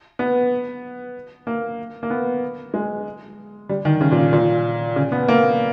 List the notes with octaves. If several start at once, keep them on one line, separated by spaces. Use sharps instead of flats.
B3
A#3
A#3
B3
G#3
G3
D#3
C#3
A#2
A#2
C#3
B3
A#3